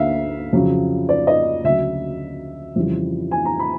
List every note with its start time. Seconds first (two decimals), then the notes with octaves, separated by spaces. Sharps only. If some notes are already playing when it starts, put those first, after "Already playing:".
Already playing: D2 D3 E5 F5
0.53 F2 C#3 F#3
1.09 D5
1.27 D#5
1.64 D2 C#3 F#3 E5
2.76 F2 C#3 E3 G3
3.31 G#5
3.45 A#5
3.59 B5